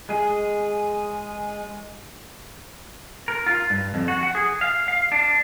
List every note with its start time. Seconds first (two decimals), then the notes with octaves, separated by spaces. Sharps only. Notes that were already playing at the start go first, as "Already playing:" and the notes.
0.09 G#3 G#4
3.28 A#4
3.46 F4
3.70 G2
3.94 F2
4.08 F#4
4.23 F#5
4.35 G#4
4.61 F5
4.88 F5
5.12 D4